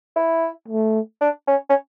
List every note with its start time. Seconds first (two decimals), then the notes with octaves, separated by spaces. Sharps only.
0.16 E4
0.68 A3
1.21 D4
1.48 C#4
1.69 C#4